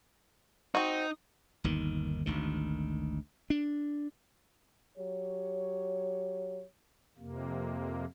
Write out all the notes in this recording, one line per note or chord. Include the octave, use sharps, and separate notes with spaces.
C4 D#4 F#4
G1 D#2 D#3
G#1 D2 D#3
D4
F#3 G4 C#5
F2 C3 A#3